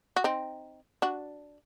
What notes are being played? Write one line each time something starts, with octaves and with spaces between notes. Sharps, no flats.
F#4
C4 D#4
D4 F#4